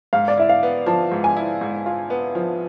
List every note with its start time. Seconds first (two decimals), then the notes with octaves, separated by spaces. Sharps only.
0.13 G#2 F5
0.28 D5
0.37 E4 E5
0.49 F5
0.63 B3
0.86 F3 A5
1.11 G#2
1.24 G#5
1.37 E4
1.61 G#2
1.86 F4
2.10 B3
2.35 F3